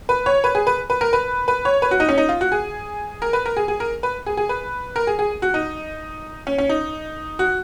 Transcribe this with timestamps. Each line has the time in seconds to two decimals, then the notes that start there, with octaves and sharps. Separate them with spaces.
0.09 B4
0.26 C#5
0.44 B4
0.55 G#4
0.67 B4
0.90 B4
1.01 A#4
1.13 B4
1.48 B4
1.65 C#5
1.82 B4
1.91 F#4
2.00 D#4
2.08 C#4
2.18 D#4
2.29 F4
2.41 F#4
2.52 G#4
3.22 A#4
3.33 B4
3.46 A#4
3.57 G#4
3.68 G#4
3.80 A#4
4.03 B4
4.26 G#4
4.37 G#4
4.49 B4
4.96 A#4
5.07 G#4
5.19 G#4
5.42 F#4
5.54 D#4
6.47 C#4
6.58 C#4
6.69 D#4
7.39 F#4